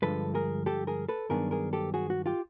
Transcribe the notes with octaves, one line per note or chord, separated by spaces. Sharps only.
G2 D3 F3 G#3 A4 B4
G#4 A#4
G4 A4
G#4 A#4
A4 B4
G2 D#3 F#3 B3 D4 G#4 A#4
G#4 A#4
G4 A4
F#4 G#4
F#4
F4 G4